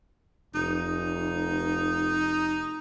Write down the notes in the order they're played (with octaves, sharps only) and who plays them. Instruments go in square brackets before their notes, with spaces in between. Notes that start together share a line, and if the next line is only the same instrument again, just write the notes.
[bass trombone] F1 [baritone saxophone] D#4